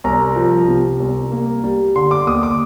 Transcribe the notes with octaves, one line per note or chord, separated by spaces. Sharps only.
C2 A#5
F3
C3
C2
A#3
G3
D3 C6
D6
D#2 D#6
D6